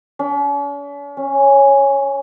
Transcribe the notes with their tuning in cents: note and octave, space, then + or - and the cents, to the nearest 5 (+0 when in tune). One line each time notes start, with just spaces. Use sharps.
C#4 +45
C#4 -5